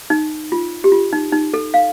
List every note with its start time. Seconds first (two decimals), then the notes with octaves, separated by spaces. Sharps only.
0.10 D#4
0.52 F4
0.84 G4
0.92 F4
1.13 D#4
1.32 D#4
1.54 A4
1.74 F5